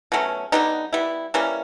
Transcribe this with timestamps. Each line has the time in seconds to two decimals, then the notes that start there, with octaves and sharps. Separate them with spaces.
0.12 B2 F#3 A3 C#4
0.52 D3 G3 B3 D#4
0.93 G3 B3 E4
1.34 E3 G3 A#3 C#4